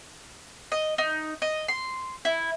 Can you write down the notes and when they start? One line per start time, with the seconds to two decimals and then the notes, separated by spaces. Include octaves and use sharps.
0.72 D#5
0.98 D#4
1.42 D#5
1.68 C6
2.25 E4